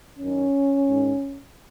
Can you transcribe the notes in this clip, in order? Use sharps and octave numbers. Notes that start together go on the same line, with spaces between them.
F#2 D#3 C#4
G#2 D#3